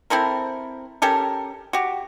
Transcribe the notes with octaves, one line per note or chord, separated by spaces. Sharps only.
C4 E4 A4 A#4
C#4 G4 A4 A#4
F#4 G4